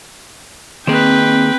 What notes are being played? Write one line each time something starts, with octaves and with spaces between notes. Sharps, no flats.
D#3 A#3 C4 G#4 B4 G5